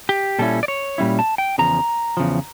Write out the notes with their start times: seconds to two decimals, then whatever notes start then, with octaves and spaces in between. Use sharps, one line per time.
0.09 G4
0.39 A#2 G3 C#4 E4 A4
0.63 D5
0.68 C#5
0.98 A#2 G3 C#4 E4
1.19 A5
1.38 G5
1.58 E2 C#3 F3 A#5
2.17 E2 C#3 F3